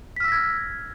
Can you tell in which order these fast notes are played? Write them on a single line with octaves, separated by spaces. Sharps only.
B6 F6 E6 A#6 G#6